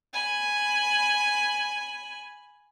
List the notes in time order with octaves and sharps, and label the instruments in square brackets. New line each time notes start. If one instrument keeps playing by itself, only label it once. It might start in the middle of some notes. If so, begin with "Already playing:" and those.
[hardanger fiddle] G#5 B5